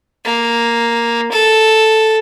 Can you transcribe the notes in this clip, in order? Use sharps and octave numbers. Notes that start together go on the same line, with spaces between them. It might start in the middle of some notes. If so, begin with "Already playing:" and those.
A#3
A4